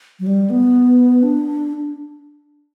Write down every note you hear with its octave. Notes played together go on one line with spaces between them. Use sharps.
F#3
G3
B3
D4